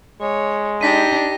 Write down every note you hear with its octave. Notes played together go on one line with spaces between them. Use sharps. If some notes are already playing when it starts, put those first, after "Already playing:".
G#3 C#5
D4 D#4 G4 A#6 B6 D#7